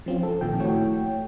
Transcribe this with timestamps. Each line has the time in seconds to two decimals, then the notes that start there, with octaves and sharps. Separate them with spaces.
0.06 F3 C4 C#4 F4
0.23 C4 A4
0.41 A#2 D#3 F3 G5
0.59 A3 E4 F#4 C#5 G5